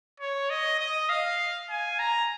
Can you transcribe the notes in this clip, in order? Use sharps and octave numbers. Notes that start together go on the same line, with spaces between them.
C#5
D#5
D#5
F5
G#5
A#5